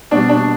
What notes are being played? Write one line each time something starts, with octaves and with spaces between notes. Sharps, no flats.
B2 G3 D4
D4